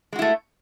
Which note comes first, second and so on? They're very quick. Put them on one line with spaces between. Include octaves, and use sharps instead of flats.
G#3 F#4 E4 A3